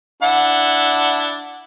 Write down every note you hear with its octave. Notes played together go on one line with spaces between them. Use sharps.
D4 E4 F#5